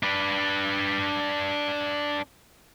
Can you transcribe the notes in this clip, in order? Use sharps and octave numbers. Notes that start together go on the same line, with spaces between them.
D4 B4